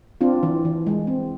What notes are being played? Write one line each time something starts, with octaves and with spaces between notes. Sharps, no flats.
C4 D4 F4
E3
E3
G#3
C4